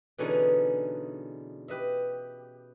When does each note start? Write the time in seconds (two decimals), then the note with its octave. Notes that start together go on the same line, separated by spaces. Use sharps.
0.18 B2 D3 E3 C#4 D#4 G#4
1.68 G4 B4 D#5 E5